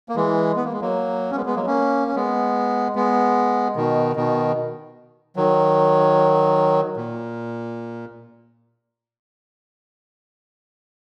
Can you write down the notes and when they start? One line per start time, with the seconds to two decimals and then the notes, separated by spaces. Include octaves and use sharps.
0.09 A#3
0.16 E3 G#3
0.56 B3
0.64 A#3
0.72 G#3
0.81 F#3 A#3
1.31 C#4
1.35 G#3 B3
1.46 G#3 B3
1.55 F#3 A#3
1.67 A#3 C#4
2.08 C#4
2.16 G#3 B3
2.96 G#3 B3
3.76 B2 D#3
4.16 B2 D#3
5.36 D#3 F#3
6.97 A#2